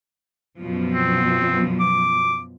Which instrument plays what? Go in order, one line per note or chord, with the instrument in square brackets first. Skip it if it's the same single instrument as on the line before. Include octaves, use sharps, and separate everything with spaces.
[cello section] F#2 B2 F3
[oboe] C4
D6